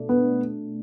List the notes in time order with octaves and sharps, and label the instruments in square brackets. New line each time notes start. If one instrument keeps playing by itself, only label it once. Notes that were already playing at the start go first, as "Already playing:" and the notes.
Already playing: [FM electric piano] B2 A3 D4
[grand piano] B3